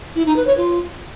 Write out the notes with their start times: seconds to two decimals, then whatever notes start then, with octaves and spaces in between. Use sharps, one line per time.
0.15 E4
0.26 D#4
0.36 B4
0.47 C#5
0.57 F4